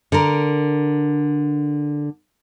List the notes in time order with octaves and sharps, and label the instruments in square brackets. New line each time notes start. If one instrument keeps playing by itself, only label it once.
[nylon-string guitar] D3 A#4